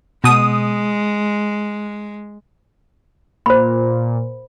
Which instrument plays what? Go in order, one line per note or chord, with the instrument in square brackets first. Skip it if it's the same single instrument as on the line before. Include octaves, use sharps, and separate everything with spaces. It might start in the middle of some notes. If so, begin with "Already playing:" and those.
[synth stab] B2 D#6 [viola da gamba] G#3
[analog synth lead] A#2 [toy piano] C5 B5